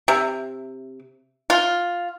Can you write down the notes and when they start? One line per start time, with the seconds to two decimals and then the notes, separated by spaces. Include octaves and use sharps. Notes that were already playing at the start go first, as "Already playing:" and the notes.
0.08 C3
1.50 F4